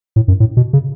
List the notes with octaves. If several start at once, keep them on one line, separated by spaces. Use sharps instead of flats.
A2
F#2
A2
B2
C#3